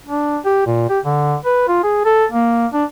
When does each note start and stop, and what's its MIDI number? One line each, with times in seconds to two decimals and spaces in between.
0.07 0.38 62
0.45 0.62 67
0.67 0.87 46
0.89 1.00 67
1.05 1.36 50
1.45 1.66 71
1.68 1.81 65
1.83 2.03 68
2.05 2.26 69
2.32 2.67 58
2.73 2.85 62